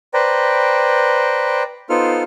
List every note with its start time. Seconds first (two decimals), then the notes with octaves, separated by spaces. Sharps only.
0.14 B4 C5 D5 G5 A#5
1.90 B3 D#4 F4 A4 C5 F6